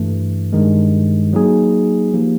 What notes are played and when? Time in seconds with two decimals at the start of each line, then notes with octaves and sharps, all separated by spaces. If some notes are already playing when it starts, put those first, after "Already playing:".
Already playing: G2 E3 A3
0.53 G2 D#3 G#3
1.33 F#3 A#3 D#4 G#4
2.13 F3 A#3 D#4 G4